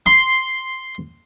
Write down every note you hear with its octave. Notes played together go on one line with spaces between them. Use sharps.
C6